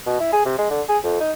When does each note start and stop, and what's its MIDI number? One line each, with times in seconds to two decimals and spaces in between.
0.06 0.15 47
0.20 0.32 64
0.33 0.44 68
0.45 0.56 48
0.58 0.66 56
0.70 0.81 50
0.88 0.98 68
1.03 1.18 41
1.20 1.32 63